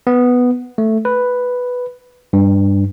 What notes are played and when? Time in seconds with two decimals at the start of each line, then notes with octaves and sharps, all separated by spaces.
0.07 B3
0.78 A3
1.05 B4
2.33 G2